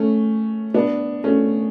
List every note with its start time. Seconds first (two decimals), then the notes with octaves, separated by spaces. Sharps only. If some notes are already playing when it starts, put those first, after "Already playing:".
Already playing: A3 C#4
0.74 B3 D4
1.24 A3 C#4